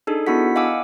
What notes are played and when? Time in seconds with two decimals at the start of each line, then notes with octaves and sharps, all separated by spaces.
0.07 D4 D#4 G#4 A4
0.26 B3 D4 E4 F#4 F#5 B6
0.55 D#5 F5 F#5 G#5 D6 E6